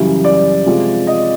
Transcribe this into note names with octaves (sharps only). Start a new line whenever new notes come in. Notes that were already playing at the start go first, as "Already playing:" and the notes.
Already playing: F#2 C#3 E3 G3
D5
C3 F3 G#3
D#5